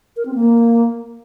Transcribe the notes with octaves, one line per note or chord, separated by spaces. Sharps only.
A#4
C4
A#3